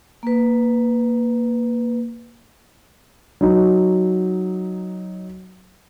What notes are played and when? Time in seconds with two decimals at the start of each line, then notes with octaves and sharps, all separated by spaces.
0.23 A#3 B4
3.41 F#3 D#4